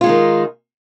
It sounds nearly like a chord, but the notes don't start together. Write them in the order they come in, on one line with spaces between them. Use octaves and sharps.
F4 G#3 D#4 D#3